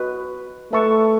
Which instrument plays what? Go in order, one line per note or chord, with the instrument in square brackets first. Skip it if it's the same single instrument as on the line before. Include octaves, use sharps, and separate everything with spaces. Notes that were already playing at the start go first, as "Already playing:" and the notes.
Already playing: [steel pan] F#4 B4 D#5
[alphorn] A3 [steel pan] B4 E5 A5 C#6